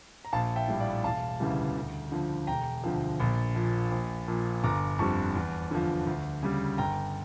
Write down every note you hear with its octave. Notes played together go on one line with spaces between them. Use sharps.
A#5
A#1 F5 A5
E5 G5
A2 G3
D5 F5
E1 F5 A5
D2 C#3 E3 G3
D2
D3 F3
E1 G5 A#5
D2 D3 F3
A#1
A#2 F3
A#1
A#2 F3
G1 A#5 D6
F2 D3 G3 A5 C#6
E2
D3 F3
D2
C#3 G3
G1 G5 A#5